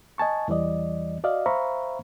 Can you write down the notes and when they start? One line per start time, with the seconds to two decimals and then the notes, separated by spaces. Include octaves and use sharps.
0.18 D#5 G#5 A5 C#6
0.48 E2 E3 G3 D5 D#5
1.24 F#4 D5 D#5 F5
1.46 C5 E5 F5 A#5 B5 C#6